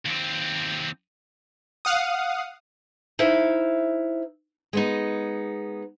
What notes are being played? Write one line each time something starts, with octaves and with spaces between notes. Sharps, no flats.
D#2 C4
F5 F#5 D#6
D#4 E4 C5 E5 F5
G#3 B3 D#4